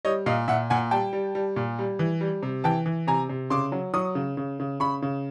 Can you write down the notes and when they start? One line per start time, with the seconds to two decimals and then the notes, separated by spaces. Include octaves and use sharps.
0.05 G3 C#5 D#5
0.26 A#2 D#5 F5
0.48 A#2 E5 F#5
0.70 A#2 F#5 G#5
0.91 G3 G5 A5
1.13 G3
1.35 G3
1.56 A#2
1.79 G3
1.99 E3
2.21 G3
2.42 C3
2.64 E3 G5 A5
2.86 E3
3.07 C3 G#5 A#5
3.29 C3
3.50 C#3 C6 D6
3.72 F#3
3.94 F#3 C#6 D#6
4.15 C#3
4.37 C#3
4.60 C#3
4.80 C#3 B5 C#6
5.02 C#3